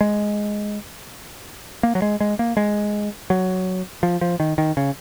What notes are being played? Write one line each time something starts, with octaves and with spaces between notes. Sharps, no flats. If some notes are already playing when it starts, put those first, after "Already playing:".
G#3
A#3
F#3
G#3
G#3
A#3
G#3
F#3
F3
F3
D#3
D#3
C#3